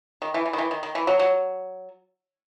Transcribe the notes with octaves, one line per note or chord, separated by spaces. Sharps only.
D#3
E3
E3
D#3
E3
D#3
D#3
E3
F#3
F#3